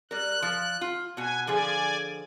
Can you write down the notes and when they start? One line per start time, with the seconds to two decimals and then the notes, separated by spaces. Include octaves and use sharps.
0.11 G3 A#4 F#6
0.42 F3
0.81 F4
1.17 B2 F#4 G#5
1.47 D3 F3 G#4 D5 G#5